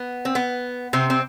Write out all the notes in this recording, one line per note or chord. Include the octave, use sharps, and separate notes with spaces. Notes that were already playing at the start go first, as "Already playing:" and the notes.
Already playing: B3
C4
B3
C3 C4
C4